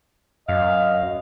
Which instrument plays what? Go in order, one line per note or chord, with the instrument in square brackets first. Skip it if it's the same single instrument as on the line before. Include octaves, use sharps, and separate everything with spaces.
[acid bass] F#2 [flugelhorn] D#5 [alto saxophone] F5